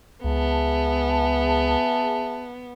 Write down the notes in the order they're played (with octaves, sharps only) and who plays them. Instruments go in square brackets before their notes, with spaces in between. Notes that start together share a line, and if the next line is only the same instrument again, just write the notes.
[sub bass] C#2 [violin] B3 [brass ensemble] G#4 E5 A5